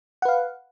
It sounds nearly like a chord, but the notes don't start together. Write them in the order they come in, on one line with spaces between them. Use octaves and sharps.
F#5 B4 F5